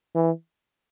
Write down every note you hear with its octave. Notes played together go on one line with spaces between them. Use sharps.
E3